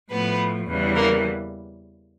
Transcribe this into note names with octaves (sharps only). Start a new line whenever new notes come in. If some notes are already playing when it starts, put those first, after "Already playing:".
A2 F3 A3 B3 B4
E2 C#3 E3 G3
A#3 A#4